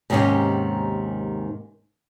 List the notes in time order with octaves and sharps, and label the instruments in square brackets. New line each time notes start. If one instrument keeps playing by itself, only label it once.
[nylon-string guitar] D#2 G#2 C3 D#3 C#4 G4